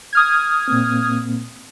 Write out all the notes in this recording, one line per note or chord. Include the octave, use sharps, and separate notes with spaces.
D#6 F6 G#6
A#2 A#3 C4